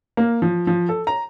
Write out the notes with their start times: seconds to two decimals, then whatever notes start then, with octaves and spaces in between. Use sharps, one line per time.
0.17 A#3
0.42 F3
0.67 F3
0.89 A4
1.07 A#5